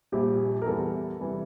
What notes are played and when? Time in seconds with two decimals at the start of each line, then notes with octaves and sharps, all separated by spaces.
0.12 A#1 A#2 G3 G4
0.62 A#4
0.66 E2 E3 G3 A4
1.21 C3 E3 G3